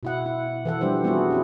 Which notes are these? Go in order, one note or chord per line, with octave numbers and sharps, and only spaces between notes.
B2 E4 F#5
E4
E3 A4 F#5
F3 G3 D4 G4 C5
G3 B3 C4 E4 F#4 G#4
C#4 E4 G#4